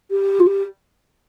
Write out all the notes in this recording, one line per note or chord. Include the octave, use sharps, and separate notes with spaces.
G4
F4
G4